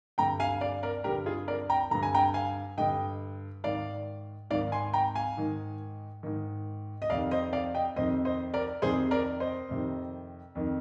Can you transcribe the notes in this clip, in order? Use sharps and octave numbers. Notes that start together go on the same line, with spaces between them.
G2 D3 G5 A#5
F5 G#5
D5 F5
A#4 D5
G2 D3 G4 A#4
F4 G#4
A#4 D5
G5 A#5
G2 D3 A#5
G#5
G5 A#5
F5 G#5
G2 D3 D#5 G5
G#2 D#3 D5 F5
G#2 D#3 D5 F5
G#5 C6
G5 A#5
F5 G#5
G#2 D#3
G#2 D#3
D#5
F2 C3 D#3 D5 F5
C5 D#5
D5 F5
D#5 G5
F2 C3 D#3 C5 D#5
C5 D#5
A#4 D5
F2 C3 D#3 G#4 C5
A#4 D5
C5 D#5
F2 C3 D#3
F2 D#3